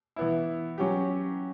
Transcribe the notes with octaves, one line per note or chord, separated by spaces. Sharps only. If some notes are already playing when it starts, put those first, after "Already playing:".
E3 B3 E4
F#3 C#4 G4